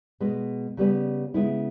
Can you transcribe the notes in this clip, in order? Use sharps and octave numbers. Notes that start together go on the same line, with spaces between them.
B2 G#3 B3
C#3 G3 B3
C#3 G#3 B3 E4